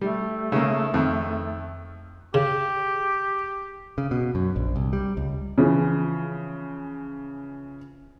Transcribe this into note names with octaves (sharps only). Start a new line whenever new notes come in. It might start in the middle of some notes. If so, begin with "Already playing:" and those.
G3 A3
C#3 A#3
F2 D#3
C#3 G4
C#3
B2
F#2
A#1
C2
G3
C#2
C#3 E3 F3